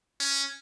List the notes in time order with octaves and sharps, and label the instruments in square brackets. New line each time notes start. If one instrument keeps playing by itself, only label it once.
[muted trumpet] C#4